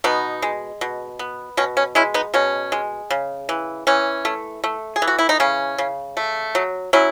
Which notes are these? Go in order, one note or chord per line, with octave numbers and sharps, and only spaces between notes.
B2 B3 D#4
G#3
B2
B3
B2 C#4
C#4
G#3 C#4 E4
B3 D#4
B2 C#4
G#3
C#3
E3
E3 C#4
A3
A3
G#4
E3
F#4
E4
D#4
C#3 C#4
C#3
A3
F#3
F#3 C#4 E4